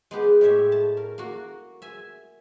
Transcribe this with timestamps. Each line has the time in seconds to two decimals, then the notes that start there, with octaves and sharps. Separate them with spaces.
0.11 G#3 B3 G4
0.41 A2 G#3 G4 C#5 E5
0.72 A5
0.97 A#4
1.18 A#3 F#4
1.82 E5 G#5